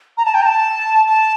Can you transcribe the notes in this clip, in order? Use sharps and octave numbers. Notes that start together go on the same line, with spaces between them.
A#5
A5
G5
A#5
A5
A5